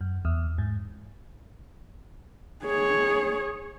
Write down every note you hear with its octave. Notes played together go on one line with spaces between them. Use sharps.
F#2
E2
G#2
G#4 C#5